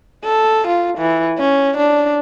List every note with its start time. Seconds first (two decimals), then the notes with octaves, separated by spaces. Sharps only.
0.24 A4
0.67 F4
0.98 E3
1.39 C#4
1.77 D4